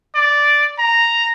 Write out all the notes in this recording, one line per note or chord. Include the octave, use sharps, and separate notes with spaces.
D5
A#5